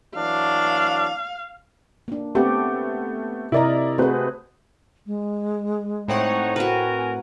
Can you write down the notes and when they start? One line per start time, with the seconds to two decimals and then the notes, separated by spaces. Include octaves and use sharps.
0.16 E3 F#3 D4 F5
2.08 A#3 D4
2.35 A3 B3 C4 G4 A4
3.52 C3 E4 A#4 D5 D#5 A#5
3.98 A3 C4 F#4 G#4 B4
5.06 G#3
6.08 A2 C4 D#4 C#5 F#5
6.56 F#4 A#4 B4 G#5